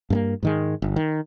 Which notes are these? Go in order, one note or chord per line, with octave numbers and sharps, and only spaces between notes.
G2 A3 A#3
G#2 D#3 G#3
G1
D#3